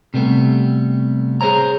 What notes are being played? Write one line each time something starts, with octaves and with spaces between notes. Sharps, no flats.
C3 G3 A3 B3
G#4 A#4 C5 C#5 A#5